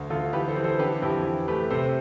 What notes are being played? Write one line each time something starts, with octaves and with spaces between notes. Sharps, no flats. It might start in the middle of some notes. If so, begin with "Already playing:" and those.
Already playing: D2
D2 F4 A4
E3 G4 B4
A4 C5
E3
A4 C5
D3 G4 B4
F2 E4 G4
E3
A3 G4 B4
C3 A4 C5